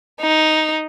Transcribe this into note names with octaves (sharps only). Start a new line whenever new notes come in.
D#4